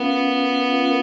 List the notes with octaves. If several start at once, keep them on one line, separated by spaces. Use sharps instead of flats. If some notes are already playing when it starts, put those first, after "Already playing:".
Already playing: B3 C#4 F4 A#4 F5
C#4 F4 A#4 F5